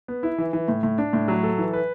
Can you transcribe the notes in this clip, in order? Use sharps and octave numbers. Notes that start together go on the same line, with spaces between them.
B3
E4
E3
E3
A2
A2
D4
A2
F#3
A4
E3
B4